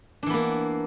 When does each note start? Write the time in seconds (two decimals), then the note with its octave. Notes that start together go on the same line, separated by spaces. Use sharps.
0.23 D4
0.26 E3
0.30 B3
0.33 A#3